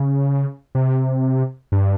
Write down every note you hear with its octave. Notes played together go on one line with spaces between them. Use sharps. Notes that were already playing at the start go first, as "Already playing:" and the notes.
Already playing: C#3
C3
G2